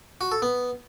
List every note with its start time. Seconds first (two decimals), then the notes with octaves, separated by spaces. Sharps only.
0.21 F#4
0.32 A4
0.42 B3